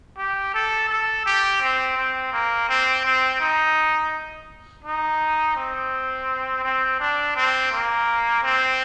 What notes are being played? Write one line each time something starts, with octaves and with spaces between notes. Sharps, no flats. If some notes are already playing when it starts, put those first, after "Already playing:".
G4
A4
A4
G4
C4
C4
A#3
C4
C4
D#4
D#4
C4
C4
D4
C4
A#3
C4